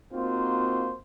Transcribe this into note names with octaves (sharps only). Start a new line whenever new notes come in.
A#3 C4 D#4 F4 F#4 C5